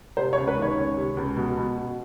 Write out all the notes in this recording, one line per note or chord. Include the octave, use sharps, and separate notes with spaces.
C3 C5
C#5
C#2
B4
D#3 C#5
C#2
C3
C#2
B2
B2
B2